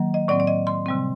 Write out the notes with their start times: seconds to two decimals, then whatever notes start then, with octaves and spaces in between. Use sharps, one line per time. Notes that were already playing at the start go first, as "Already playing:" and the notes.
Already playing: D#3 F#3 A#3
0.14 D#5
0.28 A2 F#3 C4 D5
0.40 D5
0.47 D#5
0.67 C6
0.86 C3 G3 C4